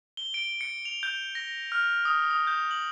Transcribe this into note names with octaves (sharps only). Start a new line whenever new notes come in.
G7
D7
C#7
F7
G6
A#6
F6
D#6
D#6
G6
F#7